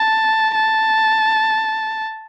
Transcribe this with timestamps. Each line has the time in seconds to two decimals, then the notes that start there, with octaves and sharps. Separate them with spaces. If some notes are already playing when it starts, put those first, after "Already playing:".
Already playing: A5
0.55 A5